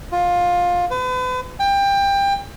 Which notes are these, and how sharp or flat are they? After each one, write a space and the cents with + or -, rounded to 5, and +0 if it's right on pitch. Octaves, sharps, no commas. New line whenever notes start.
F4 +15
B4 +40
G5 +25